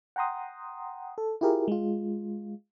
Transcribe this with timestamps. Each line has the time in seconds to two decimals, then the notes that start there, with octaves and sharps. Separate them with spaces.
0.16 F#5 G5 A#5 C6 D#6
1.18 A4
1.41 E4 F4 G4 G#4 A#4
1.68 G#3 F4